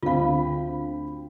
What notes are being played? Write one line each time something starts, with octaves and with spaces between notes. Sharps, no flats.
D2 C4 F4 F5 B5